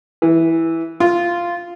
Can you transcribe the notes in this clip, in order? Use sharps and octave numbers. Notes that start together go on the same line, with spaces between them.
E3
F4